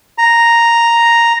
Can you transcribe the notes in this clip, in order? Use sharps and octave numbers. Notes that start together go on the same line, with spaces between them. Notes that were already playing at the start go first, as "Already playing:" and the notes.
A#5